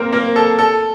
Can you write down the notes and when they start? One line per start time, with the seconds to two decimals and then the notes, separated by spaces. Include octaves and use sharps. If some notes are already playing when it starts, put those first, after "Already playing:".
Already playing: A#3 C4 A#4 C5
0.13 A#3 A#4
0.36 A4
0.59 A4